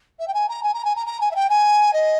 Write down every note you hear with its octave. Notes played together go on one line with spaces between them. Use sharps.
E5
G5
G#5
A#5
G#5
A#5
G#5
A#5
A#5
G#5
E5
G5
G#5
D#5